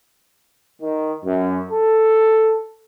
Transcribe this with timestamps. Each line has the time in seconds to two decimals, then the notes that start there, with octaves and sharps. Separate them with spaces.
0.82 D#3
1.25 F#2
1.72 A4